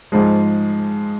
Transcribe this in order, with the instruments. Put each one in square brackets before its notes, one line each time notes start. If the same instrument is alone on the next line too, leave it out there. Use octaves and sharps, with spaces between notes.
[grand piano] G#2 F3 G#3